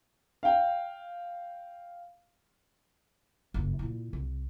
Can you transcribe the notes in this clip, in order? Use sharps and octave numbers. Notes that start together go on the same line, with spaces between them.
F5 G5
F#1 G2
A#2 E4
C2